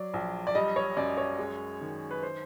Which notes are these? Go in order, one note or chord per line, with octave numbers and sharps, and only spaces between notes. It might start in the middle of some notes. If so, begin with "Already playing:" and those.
Already playing: F#3 D5
A#1
D5
G3 D#5
C#5
F#2 D5
C#5
G#3
D#3
B4
C5